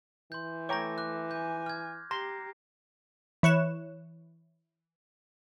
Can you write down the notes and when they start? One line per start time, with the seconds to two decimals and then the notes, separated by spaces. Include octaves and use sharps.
0.32 E3 C6 G6
0.69 A3 C#5 G5 A#5 D6 A#6
0.98 D6 F#6
1.31 G#5 G6
1.66 F6 G#6
2.11 G4 A#5 C6 A#6 C7
3.43 E3 C#5 F#6 E7